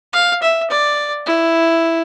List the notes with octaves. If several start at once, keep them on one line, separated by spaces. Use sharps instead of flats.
F5
E5
D5
E4